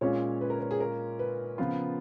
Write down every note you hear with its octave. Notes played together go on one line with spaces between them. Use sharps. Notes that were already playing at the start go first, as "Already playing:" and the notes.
A#2 G#3 C#4 F4 C#5
B4
A#4
A#4
G#4
A#4
B4
C#3 F3 B3 F4